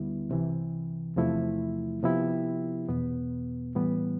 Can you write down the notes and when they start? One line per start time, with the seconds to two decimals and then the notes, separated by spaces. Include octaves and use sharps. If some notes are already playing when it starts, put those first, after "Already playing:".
Already playing: D2 D3 G3 B3 E4
0.29 C2 C3 E3
1.16 E2 C3 F3 A3 E4
2.03 C3 F3 B3 E4 G4
2.89 E2 B2 B3
3.75 A2 E3 G3 B3